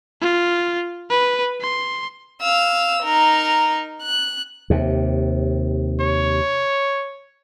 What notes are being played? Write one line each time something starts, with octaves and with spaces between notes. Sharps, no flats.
F4
B4
C6
F5 E6
D#4 A#4
F#6
D#2 C3
C#5